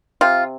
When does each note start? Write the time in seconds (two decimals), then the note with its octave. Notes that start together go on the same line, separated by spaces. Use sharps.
0.21 C3 F4